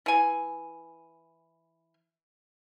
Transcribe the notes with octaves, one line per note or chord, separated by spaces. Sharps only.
E3 G#5